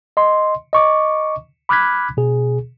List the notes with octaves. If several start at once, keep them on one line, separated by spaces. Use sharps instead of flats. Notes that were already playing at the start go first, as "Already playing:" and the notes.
D#5 C6
D#5 C#6 D6
B5 D6 F6 F#6 G#6 B6
B2 G#4